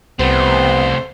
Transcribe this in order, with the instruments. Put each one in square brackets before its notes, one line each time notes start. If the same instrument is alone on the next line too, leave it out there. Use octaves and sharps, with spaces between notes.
[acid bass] C2 [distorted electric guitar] C3 A3 [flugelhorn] B3 [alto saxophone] C5